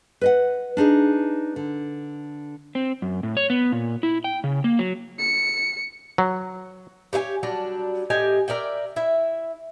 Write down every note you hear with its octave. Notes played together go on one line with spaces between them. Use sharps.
B4 D#5 F#5
D4 D#4 G#4 D#5
D3
C4
F#2
A2
C#5
B3
A#2
E4
G5
C#3
A#3
F#3
C#7
F#3
G4 C#5 E5 G#5
F#3 G3 D4 A#5
A2 G4 D#5 G#5
A#4 D5 E5 G5
E4 E5